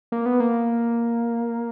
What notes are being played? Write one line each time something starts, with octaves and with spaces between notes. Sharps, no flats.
A#3
B3
A#3